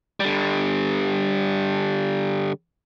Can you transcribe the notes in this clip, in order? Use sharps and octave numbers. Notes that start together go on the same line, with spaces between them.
D3 G3